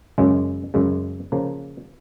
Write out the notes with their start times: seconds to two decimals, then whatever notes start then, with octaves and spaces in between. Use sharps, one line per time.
0.18 F#2 C#3 G#3
0.74 F#2 C#3 G#3
1.32 C#3 F3 A#3